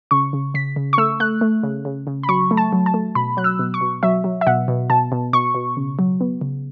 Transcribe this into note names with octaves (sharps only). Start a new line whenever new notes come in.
C#3 C#6
C#3
C#3 B6
C#3
C#6
A3 E6
A3 F#6
A3
C#3
C#3
C#3
B5
F#3 C#6
A3
A5
F#3
A5
A3
B2 B5
F#3 F#6
E6
B2
C#6
B2
F#3 E5
F#3
E5
B2 F#5
B2
B2 A5
B2
B2 C#6
B2
C#3
F#3
B3
C#3